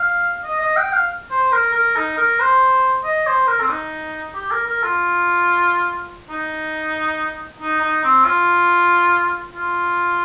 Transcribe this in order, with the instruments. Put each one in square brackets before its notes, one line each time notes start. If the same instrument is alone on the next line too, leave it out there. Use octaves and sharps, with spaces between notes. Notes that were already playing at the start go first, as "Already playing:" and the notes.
Already playing: [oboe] F5
D#5
D#5
G5
F5
C5
A#4
A#4
D#4
A#4
C5
D#5
C5
A#4
C4
D#4
G4
A#4
A#4
F4
D#4
D#4
D#4
C4
F4
F4